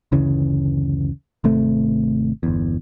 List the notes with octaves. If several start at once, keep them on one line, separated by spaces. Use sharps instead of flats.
F#1 D2 C#3 E3
G#1 C3 A3
G1 E2